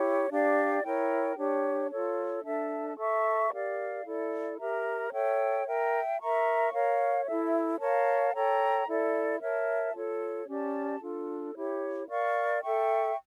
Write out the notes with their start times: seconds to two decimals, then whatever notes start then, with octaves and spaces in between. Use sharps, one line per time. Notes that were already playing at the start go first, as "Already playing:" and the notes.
Already playing: E4 G4 C#5
0.30 D4 G4 D5 F5
0.83 E4 A#4 C#5 G5
1.37 D4 G4 C#5
1.91 F4 A4 C#5
2.45 D4 A4 E5 A5
2.97 A4 E5 A5 C#6
3.52 G4 A#4 D5 F5
4.05 E4 A4 D5
4.59 G4 A#4 E5 A#5
5.12 A4 C#5 E5 G5
5.66 A#4 E5 G5
6.20 A#4 E5 A#5 C#6
6.73 A#4 C#5 F5
7.26 E4 A4 E5
7.80 A#4 C#5 F5 A5
8.34 A4 C#5 G5 A#5
8.86 E4 A4 D5
9.41 A#4 C#5 E5 A5
9.94 F4 A4 C#5
10.47 C#4 G4 D5 A5
11.01 D4 F4 A4
11.55 E4 G4 C#5
12.08 A#4 D5 F5 C#6
12.62 A4 E5 G5 C#6